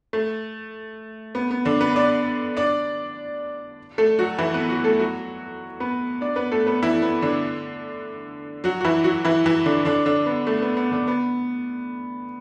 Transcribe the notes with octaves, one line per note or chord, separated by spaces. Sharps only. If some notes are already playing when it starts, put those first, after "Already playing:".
A3
B3
B3
D3 D4
B3 B4
D4 D5
D4 D5
A3 A4
F#3 F#4
E3 E4
B3 B4
F#3 F#4
A3 A4
F#3 F#4
B3 B4
D4 D5
B3 B4
A3 A4
B3 B4
E3 E4
B3
D3 D4
F#3 F#4
F#4
E3 E4
F#3 F#4
E3 E4
E3 E4
D3 D4
D3 D4
D3 D4
B3
A3
B3
B3
D3 D4
B3